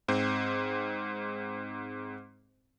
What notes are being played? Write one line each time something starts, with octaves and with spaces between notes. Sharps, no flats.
G#2 C4 C5